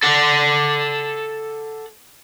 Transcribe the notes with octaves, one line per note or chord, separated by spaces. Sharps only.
A4 F#5